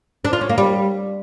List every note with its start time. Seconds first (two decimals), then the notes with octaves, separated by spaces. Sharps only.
0.25 D4
0.33 F4
0.41 C#4
0.49 A#3
0.58 G3